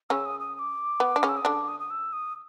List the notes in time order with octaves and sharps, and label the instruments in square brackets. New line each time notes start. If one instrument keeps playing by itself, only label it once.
[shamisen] C#3 C#4 [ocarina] E6
[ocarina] D#6
D#6
D#6
D6
[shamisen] B3
D4
C#3 C#4
[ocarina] E6
D#6
[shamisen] D3 D4 [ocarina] D6
[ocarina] D#6
D#6
E6
D#6